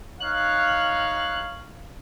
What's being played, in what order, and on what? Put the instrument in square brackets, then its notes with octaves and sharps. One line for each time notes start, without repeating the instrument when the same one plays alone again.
[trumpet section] D#4 C#5 F5 [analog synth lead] F#6